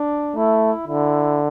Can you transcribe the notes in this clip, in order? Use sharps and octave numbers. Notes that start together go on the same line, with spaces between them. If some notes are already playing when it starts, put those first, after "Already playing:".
Already playing: D4
A3 E4
D3 E4